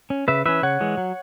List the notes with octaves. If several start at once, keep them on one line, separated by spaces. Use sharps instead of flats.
C#4
C#3 B4 E5
E3 C#4 B4 E5
C#3 C#5 F#5
E3 G#3
F#3